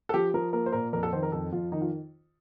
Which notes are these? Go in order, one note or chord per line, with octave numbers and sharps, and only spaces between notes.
A4
F3 G4
F3 A#4
A#3 A#4
C5
A#2 A#4
F2 A#4
A4
D#3 C5
A#4
F2 A4
F2 F4
D#3 D#4
F4